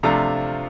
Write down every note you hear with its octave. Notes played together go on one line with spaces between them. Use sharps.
C3 F3 A3 D4 F4 A#5